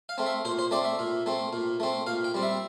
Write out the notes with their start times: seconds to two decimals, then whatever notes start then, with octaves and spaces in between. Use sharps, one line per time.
0.09 F5
0.18 A3 C4
0.26 E5
0.45 A#2 C5
0.59 C5
0.71 A3 C4 D5
0.85 E5
0.99 A#2
1.26 A3 C4
1.53 A#2
1.80 A3 C4
2.07 A#2 F5
2.24 G5
2.34 G3 C4
2.43 E5